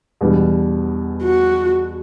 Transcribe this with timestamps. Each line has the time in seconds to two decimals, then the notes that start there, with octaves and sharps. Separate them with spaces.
0.21 E2 B2 G3 D4
1.23 F#4